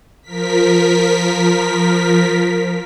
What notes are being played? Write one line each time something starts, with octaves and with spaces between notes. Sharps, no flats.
F3 A#4 B6